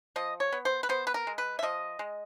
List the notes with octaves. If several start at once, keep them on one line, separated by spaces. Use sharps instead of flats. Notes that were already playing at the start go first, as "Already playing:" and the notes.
F3 D#5
C#5
B3
C5
B4
B3 C5
B4
A#4
G#3
B4
E5
F3 D#5
G#3